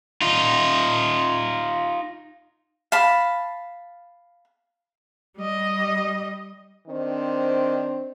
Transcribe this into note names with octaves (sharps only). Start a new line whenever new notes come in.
D#4 F4
F5 A5 B5
G3 D#5
D#3 C4 D4 C5